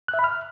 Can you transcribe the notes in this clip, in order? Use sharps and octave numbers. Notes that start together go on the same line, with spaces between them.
F#6
E5
B5
F6